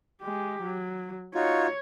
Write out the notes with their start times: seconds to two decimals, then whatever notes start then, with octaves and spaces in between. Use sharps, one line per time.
0.22 G#3 G4
0.63 F#3
1.35 D#4 F4 F#4 C#5